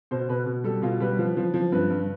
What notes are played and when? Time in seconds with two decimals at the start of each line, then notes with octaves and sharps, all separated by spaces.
0.11 B2 C5
0.29 B2 B4
0.46 B2
0.64 G3 A4
0.82 B2 F4
1.00 G3 B4
1.19 F3
1.37 F3
1.54 F3
1.72 G2 B4
1.90 G2